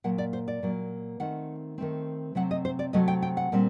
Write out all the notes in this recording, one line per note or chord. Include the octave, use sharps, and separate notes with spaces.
A#2 F#3 A#3 F#5
D5
C5
D5
A#2 F#3 A#3
D#3 A3 C4 F#5
D#3 A3 C4
C3 F#3 A3 C4 F#5
D#5
C5
D5
C3 F#3 A3 C4 D#5
G5
G5
F#5
A#2 G3 C4